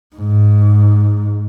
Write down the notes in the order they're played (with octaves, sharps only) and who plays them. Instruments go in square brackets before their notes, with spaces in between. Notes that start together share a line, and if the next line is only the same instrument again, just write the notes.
[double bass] G#2